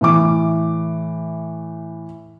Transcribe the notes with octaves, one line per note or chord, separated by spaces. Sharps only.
A2 E3 D6